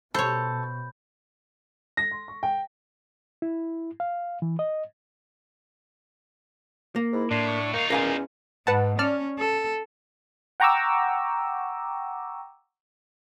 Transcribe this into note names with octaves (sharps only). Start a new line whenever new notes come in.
B2 A4 C5 C#5 B5 G6
A#6
C6
C#6
G5
E4
F5
E3
D#5
A#3
G#2 E4
A2 D4 C6
C#6
A#3 D#4 F4
E2 C#4 A#4 F5 G#5
G#2 B4 F#5 A5
C#4 D5 A5 F6
A4
F#5 G5 A#5 C#6 D6 E6